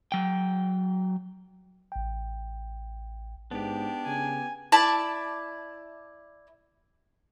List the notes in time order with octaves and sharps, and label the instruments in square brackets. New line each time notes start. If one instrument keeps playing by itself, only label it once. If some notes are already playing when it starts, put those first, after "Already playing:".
[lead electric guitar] F#3 G5
[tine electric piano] A1 G5
[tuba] G#2 [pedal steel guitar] B3 G4 [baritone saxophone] D4
[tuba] C#3 [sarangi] G#5
[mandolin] E4 D5 A5